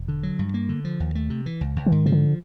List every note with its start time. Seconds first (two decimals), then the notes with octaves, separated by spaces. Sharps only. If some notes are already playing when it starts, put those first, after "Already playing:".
Already playing: E1
0.08 D3
0.23 F#3
0.39 G2
0.54 A#3
0.69 D3
0.85 F3
1.00 D#2
1.15 A3
1.30 C3
1.46 E3
1.61 C#2
1.76 C#2
1.86 E3
1.92 G#2 D#3
2.06 C#3 F3
2.12 D3